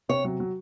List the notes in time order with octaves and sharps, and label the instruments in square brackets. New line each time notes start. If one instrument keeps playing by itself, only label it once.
[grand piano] C3 [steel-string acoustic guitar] C#5
[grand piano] F#3
F#3